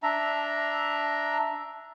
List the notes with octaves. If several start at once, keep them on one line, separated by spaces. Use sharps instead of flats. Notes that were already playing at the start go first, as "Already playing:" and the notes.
D4 E5 A#5